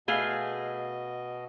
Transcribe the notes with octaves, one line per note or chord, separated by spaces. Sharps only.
B2 A3 G#4 D#5 F5